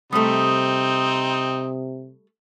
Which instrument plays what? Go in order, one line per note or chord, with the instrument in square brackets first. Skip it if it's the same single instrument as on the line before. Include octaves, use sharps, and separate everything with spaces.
[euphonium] C3 [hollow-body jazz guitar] G3 A3 [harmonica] C4 D#4 [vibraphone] D#6